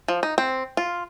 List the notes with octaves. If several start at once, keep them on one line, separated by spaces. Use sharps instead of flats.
F3
D#4
C4
F4